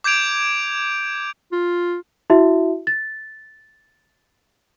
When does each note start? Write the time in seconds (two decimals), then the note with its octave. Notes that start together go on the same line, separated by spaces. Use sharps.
0.04 D6 G6 G#6 D7 F7
1.52 F4
2.30 E4 F#4 E5
2.87 A6